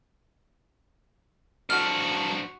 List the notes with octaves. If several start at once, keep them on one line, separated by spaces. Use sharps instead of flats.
D3 F3 F#3 F#4 A4 F6